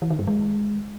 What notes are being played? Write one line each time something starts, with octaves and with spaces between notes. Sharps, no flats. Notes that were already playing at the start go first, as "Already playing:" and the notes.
E3
D#3
G2
G#3